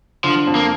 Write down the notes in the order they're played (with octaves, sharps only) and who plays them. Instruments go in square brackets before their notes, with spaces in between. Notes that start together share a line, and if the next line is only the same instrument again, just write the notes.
[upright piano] D3 [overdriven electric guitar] F3
[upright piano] F2
[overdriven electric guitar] A#3